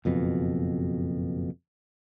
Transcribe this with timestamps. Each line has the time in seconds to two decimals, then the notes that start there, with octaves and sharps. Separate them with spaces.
0.05 F#1 F2 B2